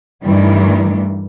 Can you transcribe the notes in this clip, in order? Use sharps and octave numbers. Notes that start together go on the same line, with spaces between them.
G2 D#3 E3 G3 A3